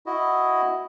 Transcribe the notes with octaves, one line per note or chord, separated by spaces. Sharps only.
E4 F#4 D#5